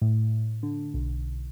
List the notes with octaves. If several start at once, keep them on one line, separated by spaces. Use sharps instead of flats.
A2
D3
B1